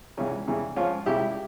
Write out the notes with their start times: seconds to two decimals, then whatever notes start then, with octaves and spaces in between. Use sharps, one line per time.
0.17 C#2 C#3 E3 G3 C#4
0.47 E2 C#3 E3 G3
0.76 G#2 F3 C#4 F4
1.06 C#2 C#3 G3 E4 G4